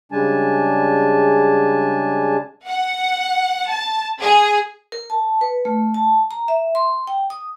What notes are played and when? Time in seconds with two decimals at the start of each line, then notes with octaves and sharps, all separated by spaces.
0.12 C#3 G3 G#3 D4 G#5 A5
2.67 F#5
3.69 A5
4.21 G#4
4.92 A#4
5.10 A5
5.41 B4
5.65 A3
5.94 A5
6.31 A#5
6.48 E5
6.75 C6
7.07 G5
7.30 D#6